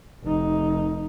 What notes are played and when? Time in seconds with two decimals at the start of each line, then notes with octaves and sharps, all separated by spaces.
0.24 F1 D#4